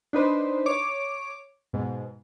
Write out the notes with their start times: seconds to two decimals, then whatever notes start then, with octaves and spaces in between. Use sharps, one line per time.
0.13 D4 D#4 B4 C5
0.66 C#5 D6
1.73 G#2 B2